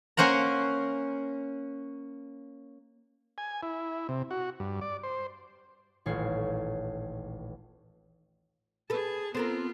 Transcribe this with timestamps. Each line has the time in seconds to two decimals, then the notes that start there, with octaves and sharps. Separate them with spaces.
0.17 A#3 C#4 C5 F#5 A#5
3.38 G#5
3.63 E4
4.09 C3
4.31 F#4
4.60 G2
4.81 D5
5.03 C5
6.06 D#1 A1 F4 C#5 C7
8.90 G#4 A4 B4 A5
9.35 B3 C4 F4 A4 A#4